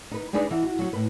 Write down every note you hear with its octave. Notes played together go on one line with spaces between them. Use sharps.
D#4 B4
G#3 D4 D#4 G#4 B4 D5
E3 D#5 F#5
F#4
F#3 F#4
A2 B4